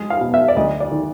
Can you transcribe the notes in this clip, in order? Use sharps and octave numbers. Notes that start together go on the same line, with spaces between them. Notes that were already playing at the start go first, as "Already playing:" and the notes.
Already playing: G#3
F5
B2
E5
D5
D2 D#5
D5
D#3